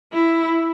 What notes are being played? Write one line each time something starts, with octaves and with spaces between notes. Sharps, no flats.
E4